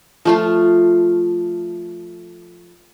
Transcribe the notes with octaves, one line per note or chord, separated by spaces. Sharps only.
F3 A3 F4